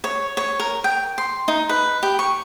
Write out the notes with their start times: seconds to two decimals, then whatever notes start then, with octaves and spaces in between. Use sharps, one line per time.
0.04 C#5
0.37 C#5
0.60 A#4
0.84 G5
1.18 C6
1.48 D#4
1.69 B4
2.03 G4
2.19 C#6